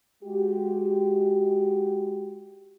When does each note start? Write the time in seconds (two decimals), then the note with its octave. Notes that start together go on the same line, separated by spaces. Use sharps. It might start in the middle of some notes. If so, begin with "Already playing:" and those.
0.23 G#3 F#4 G4